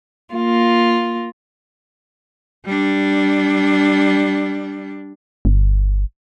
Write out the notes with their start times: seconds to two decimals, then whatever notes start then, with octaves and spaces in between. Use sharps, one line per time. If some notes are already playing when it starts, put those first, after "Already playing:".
0.34 A#3 F4
2.66 G3 D4
5.45 G1